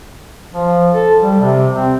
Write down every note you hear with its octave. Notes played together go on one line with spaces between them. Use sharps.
F3
A4
G3
C3
C4